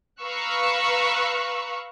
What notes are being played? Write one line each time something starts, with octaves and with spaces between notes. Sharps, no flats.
B4 F5 A#5 C#6 E6 F#6